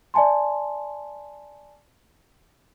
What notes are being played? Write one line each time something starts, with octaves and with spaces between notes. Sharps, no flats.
D5 E5 G#5 A5 C6